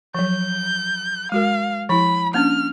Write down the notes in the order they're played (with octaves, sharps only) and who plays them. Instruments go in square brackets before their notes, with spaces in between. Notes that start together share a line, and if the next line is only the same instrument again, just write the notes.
[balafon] F3 F#3 [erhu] G6
[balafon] G#3 F#4 A#4 [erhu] F5
[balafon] F3 E4 [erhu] B5
[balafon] A#3 C#4 D4 [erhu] F6